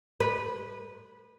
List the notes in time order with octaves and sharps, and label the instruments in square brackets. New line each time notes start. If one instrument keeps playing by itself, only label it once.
[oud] B4